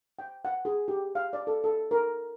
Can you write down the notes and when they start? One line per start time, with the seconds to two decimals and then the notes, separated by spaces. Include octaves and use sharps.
0.19 G5
0.45 F#5
0.65 G#4
0.88 G4
1.15 F5
1.33 D5
1.47 A4
1.64 A4
1.91 A#4